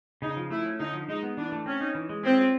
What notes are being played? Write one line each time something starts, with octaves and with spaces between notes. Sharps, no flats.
C#3 D#4
F3
A3 E4
C#4
D3 D#4
F3
G#3 D#4
B3
E3 D4
A3
C4 C#4
D#4
E3
G#3
C4 C#4
F4